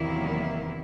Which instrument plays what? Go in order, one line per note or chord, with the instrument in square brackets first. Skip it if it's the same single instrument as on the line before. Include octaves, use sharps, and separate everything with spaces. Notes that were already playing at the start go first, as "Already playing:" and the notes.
Already playing: [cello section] E2 C3 D#3 F#3 A#3 E4